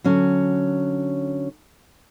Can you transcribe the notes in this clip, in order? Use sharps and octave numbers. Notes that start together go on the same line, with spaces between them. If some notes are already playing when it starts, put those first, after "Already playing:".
D3 F#3 C#4